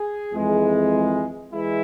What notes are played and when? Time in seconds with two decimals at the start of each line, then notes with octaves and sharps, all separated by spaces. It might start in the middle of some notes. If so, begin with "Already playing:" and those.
Already playing: G#4
0.32 F2 E3 G#3
1.52 E3 G#3 E4